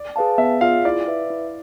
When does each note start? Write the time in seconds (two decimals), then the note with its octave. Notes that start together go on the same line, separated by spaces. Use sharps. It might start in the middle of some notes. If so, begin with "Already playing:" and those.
Already playing: D5
0.16 G#4 B4 F5 A5
0.38 B3 E5
0.61 F4 G#4 D5 F5
0.85 E4 D5
1.07 B4 E5
1.30 E4